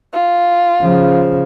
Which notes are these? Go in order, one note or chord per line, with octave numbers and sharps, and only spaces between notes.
F4
C#3 F3